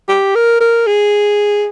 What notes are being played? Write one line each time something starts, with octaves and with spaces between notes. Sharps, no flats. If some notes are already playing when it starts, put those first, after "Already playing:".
G4
A#4
A#4
G#4